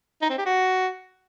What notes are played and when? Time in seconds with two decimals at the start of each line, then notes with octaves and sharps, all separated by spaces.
0.22 D#4
0.30 C4
0.38 G4
0.46 F#4